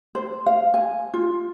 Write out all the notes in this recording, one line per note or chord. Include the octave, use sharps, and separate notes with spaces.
C5
F5
G#5
F4